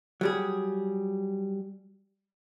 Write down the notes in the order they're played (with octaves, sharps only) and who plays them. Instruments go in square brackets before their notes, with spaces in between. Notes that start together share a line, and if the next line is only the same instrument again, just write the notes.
[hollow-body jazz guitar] F#3 G3 G#4